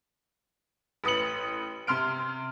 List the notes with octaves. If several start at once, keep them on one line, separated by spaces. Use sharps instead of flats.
A1 B4 D#6 C#7 F#7
C3 C6 F6 D7